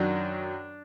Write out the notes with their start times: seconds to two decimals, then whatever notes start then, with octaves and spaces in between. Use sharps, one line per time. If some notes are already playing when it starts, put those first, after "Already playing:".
Already playing: F#2 D#3 F#3 D4